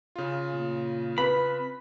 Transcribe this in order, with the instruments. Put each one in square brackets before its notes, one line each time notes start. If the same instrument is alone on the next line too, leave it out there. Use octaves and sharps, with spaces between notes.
[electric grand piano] C#3 F4
[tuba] A#2
[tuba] C4 [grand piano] B4 [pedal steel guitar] B5